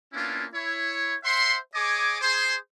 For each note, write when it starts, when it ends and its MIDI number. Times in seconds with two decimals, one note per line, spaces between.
0.13 0.45 58
0.13 0.45 59
0.13 0.45 61
0.13 0.45 62
0.13 0.45 64
0.13 0.45 65
0.54 1.15 64
0.54 1.15 73
1.24 1.57 72
1.24 1.57 76
1.24 1.57 78
1.24 1.57 84
1.74 2.21 68
1.74 2.21 73
1.74 2.21 75
1.74 2.21 80
1.74 2.21 86
2.21 2.55 68
2.21 2.55 72
2.21 2.55 84